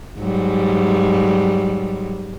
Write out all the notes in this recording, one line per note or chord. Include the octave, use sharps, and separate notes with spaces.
G#2 F#3 G3